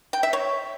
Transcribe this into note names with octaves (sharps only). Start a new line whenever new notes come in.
G5
E5
C#5